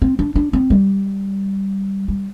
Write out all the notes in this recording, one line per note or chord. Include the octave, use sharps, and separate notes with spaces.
C4
D4
D4
C4
G3
G3